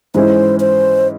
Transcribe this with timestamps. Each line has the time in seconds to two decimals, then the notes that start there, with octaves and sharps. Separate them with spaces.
0.14 G#2 E3 G#3 C#4 E4 C5
0.60 C5